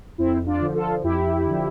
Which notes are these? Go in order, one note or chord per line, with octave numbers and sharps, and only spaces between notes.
F2 C4 E4
D4 F4
D3 F3
F4 A4
F2 E4 G4
D3 F3